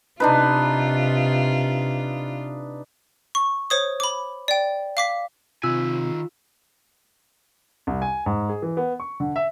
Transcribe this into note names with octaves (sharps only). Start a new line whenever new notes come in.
C3 D4 D#4 F4 B4
C#6
C5 C#5 D#6
B5 D6
D5 G5
F5 D6 B6
C3 D#3 F4 G#5 E6
C2
G#5
G#2
G#4
E3
B3
C#6
D3
E5